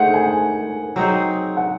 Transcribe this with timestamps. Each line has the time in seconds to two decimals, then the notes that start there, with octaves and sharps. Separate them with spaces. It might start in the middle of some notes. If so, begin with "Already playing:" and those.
Already playing: A3 D#4 G#4 C5 F#5
0.14 G#5
0.96 F#3 C4 D#4 G#4
1.57 F#5